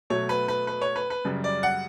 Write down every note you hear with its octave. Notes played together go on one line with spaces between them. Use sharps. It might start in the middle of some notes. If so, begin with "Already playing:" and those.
B2 F#3 A3 C#5
B4
B4
B4
C#5
B4
B4
F#2 C#3 G3
D5
F#5